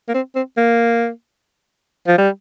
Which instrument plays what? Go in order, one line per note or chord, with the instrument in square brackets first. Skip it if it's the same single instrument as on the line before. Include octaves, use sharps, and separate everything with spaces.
[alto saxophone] A#3
C4
C4
A#3
F3
G3